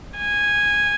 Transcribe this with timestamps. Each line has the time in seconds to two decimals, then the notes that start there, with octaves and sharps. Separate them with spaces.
0.17 G#5